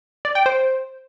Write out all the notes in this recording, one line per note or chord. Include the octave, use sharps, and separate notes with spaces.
D5
G5
C5